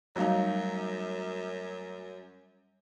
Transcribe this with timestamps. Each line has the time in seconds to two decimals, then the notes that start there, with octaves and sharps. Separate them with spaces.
0.16 F#2 F#3 G3 A3 D#4 F5